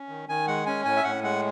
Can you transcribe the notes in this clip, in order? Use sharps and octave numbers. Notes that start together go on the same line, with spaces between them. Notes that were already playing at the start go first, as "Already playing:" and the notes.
Already playing: C#4
D#3
D#3 G#5
G#3 F#5
C#4 G#5
A2 G#5
E5
A2 F#5
G#3 F#5